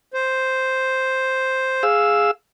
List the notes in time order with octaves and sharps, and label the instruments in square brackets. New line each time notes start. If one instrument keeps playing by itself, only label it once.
[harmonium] C5
[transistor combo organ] G#4 F5 E6